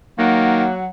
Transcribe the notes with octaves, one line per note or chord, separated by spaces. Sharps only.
D#3 F#3 A#3 F#5